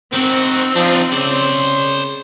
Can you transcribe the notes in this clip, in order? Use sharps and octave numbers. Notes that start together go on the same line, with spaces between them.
D#3 C4 F#4
F3 D4 D#4
C#3 C5 D5